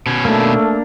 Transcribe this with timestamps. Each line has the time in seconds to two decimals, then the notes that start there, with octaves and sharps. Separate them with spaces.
0.06 B2 C#4
0.25 A3 A#3 D4